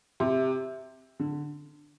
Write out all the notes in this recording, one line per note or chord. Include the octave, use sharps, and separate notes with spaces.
C3
D3